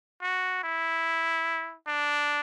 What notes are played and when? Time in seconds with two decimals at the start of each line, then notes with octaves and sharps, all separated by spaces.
0.22 F#4
0.64 E4
1.87 D4